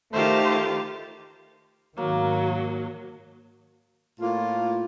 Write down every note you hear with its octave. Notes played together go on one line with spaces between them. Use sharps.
D#3 A3 F4 G4 C5
G#2 D#3 F#3 A#3
A2 A#3 F4